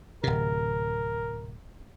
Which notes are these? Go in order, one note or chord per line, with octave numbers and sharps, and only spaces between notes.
D1 C3 A#4